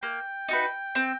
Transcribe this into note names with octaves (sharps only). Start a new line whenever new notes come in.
A#3 G5
D#4 F#4 B4
C4